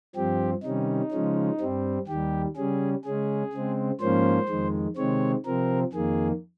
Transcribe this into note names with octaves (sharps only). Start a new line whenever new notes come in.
G2 F3 C4 G4
C3 D#3 G3 C#4 D#4
C#3 F3 G#3 C#4
G2 G3 C4
D#2 D#3 G3 G4
C#3 G3 C#4 G#4
C#3 G#3 C#4 G#4
C#3 G#3 C4
G#2 F3 A#3 C#4 C5
F2 D#3 G#3
C3 D#3 G#3 C4 C#5
C3 F3 C4 A#4
F2 D#3 A#3 G#4